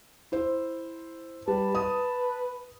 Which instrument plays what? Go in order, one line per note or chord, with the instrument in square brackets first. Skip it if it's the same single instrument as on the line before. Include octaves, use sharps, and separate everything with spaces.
[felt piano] E4 C5
[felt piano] G3 [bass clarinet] B4 [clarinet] A5
[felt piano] D#6